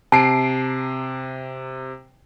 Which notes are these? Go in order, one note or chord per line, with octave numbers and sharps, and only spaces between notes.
C3 A5 C7 D7